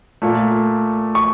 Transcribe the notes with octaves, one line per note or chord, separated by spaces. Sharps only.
A#2 A3
C#6